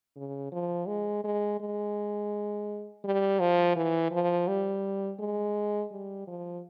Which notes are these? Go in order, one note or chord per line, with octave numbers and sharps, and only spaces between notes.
C#3
F3
G#3
G#3
G#3
G3
F3
E3
F3
G3
G#3
G3
F3